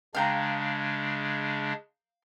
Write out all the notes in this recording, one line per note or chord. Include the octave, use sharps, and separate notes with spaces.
C#3 G#3 D4 F5 G5 A#5